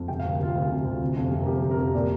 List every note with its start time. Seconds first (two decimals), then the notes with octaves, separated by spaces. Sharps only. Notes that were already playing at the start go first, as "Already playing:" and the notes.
Already playing: F2
0.08 C3 G5
0.20 F5
0.24 D2
0.32 A#4
0.40 C3 F4
0.56 D2
0.70 C3
0.85 D2
1.02 C3
1.17 F2
1.32 C3
1.43 A#4
1.47 F2 G4
1.62 C3
1.71 A#4
1.78 F2
1.94 A#2 D5